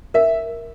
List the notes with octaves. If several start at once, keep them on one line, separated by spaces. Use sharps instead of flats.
A#4 E5